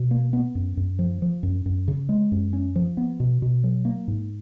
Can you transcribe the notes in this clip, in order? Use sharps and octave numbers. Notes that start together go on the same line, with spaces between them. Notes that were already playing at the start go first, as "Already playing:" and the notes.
Already playing: B2
A#3
B3
F#2
F#2
F3
F3
F#2
F#2
C#3
G#3
F#2
C#4
F3
B3
B2
B2
F#3
A#3
G#2